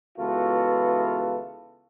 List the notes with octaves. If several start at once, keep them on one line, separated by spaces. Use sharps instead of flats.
C#2 E3 B3 F4 F#4 A4